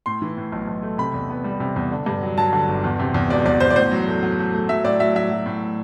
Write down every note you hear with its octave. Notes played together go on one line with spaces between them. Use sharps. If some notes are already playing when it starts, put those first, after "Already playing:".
A2 C6
E3
A2
B1
B1
A3
C3 B5
E2
B3
G3
C3
E2
D3
G2
F#3
F#3 A5
D3
G1
E2
C3
E2
E1 D5
E2 D5
E2 C5
D5
A2 C5
F#3
A3
F#3
A3
A3
F#3 E5
A2 D5
F#3 E5
F#3 E5
F#3
A2